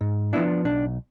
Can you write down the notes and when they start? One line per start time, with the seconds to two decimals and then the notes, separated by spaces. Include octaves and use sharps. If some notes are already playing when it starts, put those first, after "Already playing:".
0.01 G#2
0.33 F3 B3 D4 E4
0.65 B1 D4